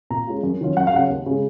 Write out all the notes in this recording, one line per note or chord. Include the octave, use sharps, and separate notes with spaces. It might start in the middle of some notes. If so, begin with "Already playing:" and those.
A#2 A#5
G#3 C#4 F4
F#2
D#3 F#3 C#4 F4
F#2 F#5
F5
C#3 F#3 C#4 F#5
D#2
C#3 G#3